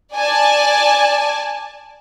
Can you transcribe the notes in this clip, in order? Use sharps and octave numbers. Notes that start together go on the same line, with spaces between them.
D5 G#5 A5